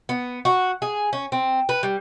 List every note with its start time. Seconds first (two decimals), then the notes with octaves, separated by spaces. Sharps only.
0.09 B3
0.45 F#4
0.82 G#4
1.13 C#4
1.32 C4
1.69 B4
1.83 G3